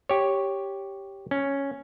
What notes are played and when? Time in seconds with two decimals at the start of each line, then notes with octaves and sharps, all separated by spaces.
0.09 G4 C#5
1.31 C#4